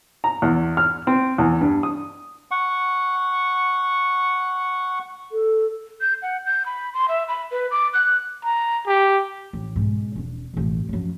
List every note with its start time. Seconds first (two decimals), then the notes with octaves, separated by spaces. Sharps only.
0.24 A#5
0.42 E2
0.77 F6
1.07 C4
1.38 E2
1.61 G2
1.83 D#6
2.51 F#5 C#6
5.32 A4
6.01 G6
6.22 F#5
6.46 G6
6.66 B5
6.94 C6
7.08 E5
7.28 B5
7.51 B4
7.71 D6
7.93 F#6
8.44 A#5
8.86 G4
9.53 A1
9.76 G#2 B2
10.16 E1 D4
10.54 E1 A1
10.89 F#2 F3